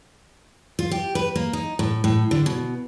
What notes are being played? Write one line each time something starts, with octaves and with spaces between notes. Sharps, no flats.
F4
G4
B4
A#3
D#4
A2
A2
D3
B2